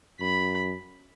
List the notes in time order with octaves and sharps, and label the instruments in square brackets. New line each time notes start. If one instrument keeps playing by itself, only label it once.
[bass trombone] F#2 [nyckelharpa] B5